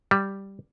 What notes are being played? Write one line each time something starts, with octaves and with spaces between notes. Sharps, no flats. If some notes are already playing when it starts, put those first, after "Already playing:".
G3